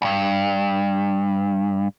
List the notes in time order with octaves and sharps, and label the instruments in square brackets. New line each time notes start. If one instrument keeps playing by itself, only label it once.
[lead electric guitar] C#2 G2